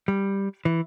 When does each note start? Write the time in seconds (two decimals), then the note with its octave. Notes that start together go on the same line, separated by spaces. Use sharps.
0.08 G3
0.65 E3